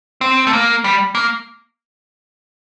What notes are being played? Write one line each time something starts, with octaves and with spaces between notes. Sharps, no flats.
C4
A3
A#3
G3
A#3